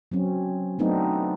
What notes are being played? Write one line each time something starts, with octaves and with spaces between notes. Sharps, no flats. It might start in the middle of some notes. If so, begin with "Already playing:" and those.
F#3 C4 C#4
F#3 A3 B3 C4 D4 D#4